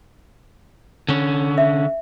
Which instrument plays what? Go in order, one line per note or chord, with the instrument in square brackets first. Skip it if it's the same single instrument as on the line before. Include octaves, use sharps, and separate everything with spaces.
[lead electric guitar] D3 C#4
[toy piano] E5